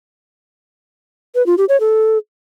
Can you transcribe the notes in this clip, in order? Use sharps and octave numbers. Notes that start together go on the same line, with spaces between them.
B4
F4
G4
C#5
A4